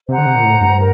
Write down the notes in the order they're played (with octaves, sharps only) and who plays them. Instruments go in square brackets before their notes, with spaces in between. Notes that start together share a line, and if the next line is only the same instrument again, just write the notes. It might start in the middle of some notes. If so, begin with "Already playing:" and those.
[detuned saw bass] C3 [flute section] C5 F#5 A#5
[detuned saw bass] D3
C3
A#2
A2
G2
[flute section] A#4